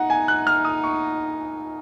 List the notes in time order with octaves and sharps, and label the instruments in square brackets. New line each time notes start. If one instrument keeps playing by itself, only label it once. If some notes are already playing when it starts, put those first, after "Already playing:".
Already playing: [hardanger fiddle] D#4 [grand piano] F#5
[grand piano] G#5
F#6
F6
D#6
C#6